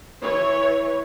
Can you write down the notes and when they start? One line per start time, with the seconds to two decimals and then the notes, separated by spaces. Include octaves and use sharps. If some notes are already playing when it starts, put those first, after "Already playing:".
0.23 E3 C#5